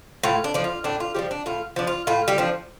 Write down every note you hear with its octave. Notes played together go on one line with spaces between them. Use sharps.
A2 F4
D4
F3 D4
F4
A2 D4
F4
F3 G3 D4 G4
D4
A2 F4
F3 D4
F4
A2 F4
G3 G4
F3 D4